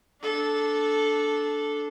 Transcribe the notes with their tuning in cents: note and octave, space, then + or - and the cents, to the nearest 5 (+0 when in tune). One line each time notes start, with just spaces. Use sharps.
D4 +0 A4 -10